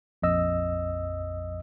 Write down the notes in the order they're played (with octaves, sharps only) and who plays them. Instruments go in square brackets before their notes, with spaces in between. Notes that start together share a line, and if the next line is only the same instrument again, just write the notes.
[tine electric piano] A#1 F2 D#5 E6